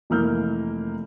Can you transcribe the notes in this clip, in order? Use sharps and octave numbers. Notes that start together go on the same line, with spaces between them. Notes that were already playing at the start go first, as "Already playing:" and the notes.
F1 E3 A#3 F6 G6